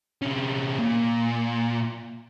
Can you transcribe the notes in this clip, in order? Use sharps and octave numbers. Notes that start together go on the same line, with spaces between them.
C3 C#4
A#2